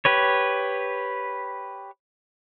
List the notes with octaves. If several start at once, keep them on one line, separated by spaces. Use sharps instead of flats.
G4 B4 C#5